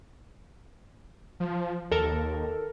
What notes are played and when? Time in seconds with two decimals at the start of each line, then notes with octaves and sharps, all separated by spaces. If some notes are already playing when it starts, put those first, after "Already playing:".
1.40 F3
1.92 D#2 A4 A#4